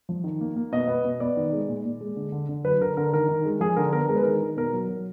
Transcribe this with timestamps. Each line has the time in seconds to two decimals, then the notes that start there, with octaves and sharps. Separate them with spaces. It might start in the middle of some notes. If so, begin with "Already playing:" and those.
0.09 F3
0.24 D#3
0.41 A#3
0.56 A#3
0.72 B2 D#5
0.88 B3
1.04 B2
1.20 B3 D5
1.37 D#3
1.53 G#3
1.69 A#2
1.85 A#2
2.01 G#3
2.16 D3
2.32 D3
2.49 D3
2.64 F#3 B4
2.81 D3 A#4
2.97 D3 A#4
3.13 D#3 A#4
3.28 D#3
3.45 G#3
3.60 F3 G#4
3.76 D3 A#4
3.93 B3 A#4
4.09 G#3 A#4
4.16 B4
4.24 D#3 A#4
4.41 D#3
4.57 B2 A#4
4.73 F#3
4.89 F#3